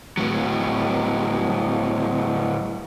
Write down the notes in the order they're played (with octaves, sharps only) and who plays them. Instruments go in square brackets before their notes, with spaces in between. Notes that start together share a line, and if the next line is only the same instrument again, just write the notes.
[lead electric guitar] A2 F#3